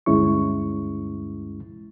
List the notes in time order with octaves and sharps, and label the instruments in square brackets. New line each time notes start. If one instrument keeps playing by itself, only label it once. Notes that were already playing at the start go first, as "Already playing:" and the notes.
[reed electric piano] D2 G2 G#3 C#4 E4 C#6